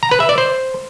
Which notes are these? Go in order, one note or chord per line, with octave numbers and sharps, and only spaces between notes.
A#5
B4
E5
D5
C5